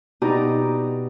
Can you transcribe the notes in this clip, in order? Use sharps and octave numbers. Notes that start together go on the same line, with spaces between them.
B2 D#4 G4 D5 A#5 D#6